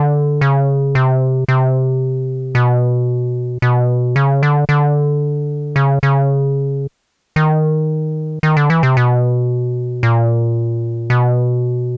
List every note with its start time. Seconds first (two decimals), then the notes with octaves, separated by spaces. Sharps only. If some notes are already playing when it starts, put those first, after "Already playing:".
Already playing: D3
0.41 C#3
0.95 C3
1.48 C3
2.55 B2
3.62 B2
4.16 C#3
4.43 D3
4.69 D3
5.76 C#3
6.03 C#3
7.36 D#3
8.43 D#3
8.57 D3
8.70 E3
8.83 C3
8.97 B2
10.03 A#2
11.10 B2